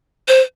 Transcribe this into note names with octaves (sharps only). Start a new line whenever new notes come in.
C5